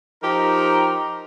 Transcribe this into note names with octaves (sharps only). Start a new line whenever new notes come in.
F3 D#4 G4 A#4 A#5